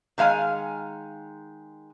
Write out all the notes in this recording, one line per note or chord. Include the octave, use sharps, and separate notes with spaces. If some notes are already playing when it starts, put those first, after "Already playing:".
D#3 G#3 F5 G#5